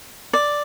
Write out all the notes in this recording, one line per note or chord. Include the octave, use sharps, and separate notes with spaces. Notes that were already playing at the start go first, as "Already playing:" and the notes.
D5